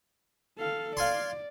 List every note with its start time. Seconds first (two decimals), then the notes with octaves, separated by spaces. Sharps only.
0.58 A4 F5
0.97 D5 F5 G#5 C6